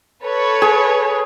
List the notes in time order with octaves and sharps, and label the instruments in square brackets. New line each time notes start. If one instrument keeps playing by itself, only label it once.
[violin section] A4 B4 C#5
[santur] G#4